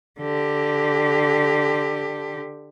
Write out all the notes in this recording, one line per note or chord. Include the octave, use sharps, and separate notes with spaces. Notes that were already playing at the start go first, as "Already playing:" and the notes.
D3 G4